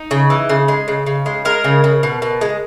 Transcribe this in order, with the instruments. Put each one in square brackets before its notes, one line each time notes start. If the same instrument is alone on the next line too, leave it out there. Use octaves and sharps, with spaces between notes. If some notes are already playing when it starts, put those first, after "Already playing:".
Already playing: [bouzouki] D#4
C#3
E3
C#3
G#3
C#3
C#3
G#3
G#3 A#4
C#3
C#3
B2
B2
G#3